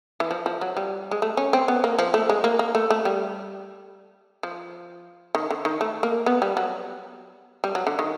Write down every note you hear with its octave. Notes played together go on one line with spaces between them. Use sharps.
E3
F3
F3
F#3
G3
G#3
A3
C#4
C4
B3
A#3
F3
A3
G#3
A#3
A#3
A3
A3
G3
F3
D#3
D3
D#3
A3
A#3
B3
G3
F#3
G3
F#3
D3
D#3